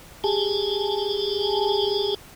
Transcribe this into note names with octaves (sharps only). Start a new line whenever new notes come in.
G4 G#4 G#5 A5